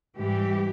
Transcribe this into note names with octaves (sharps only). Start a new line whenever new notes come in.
G#2 E3 G3 G4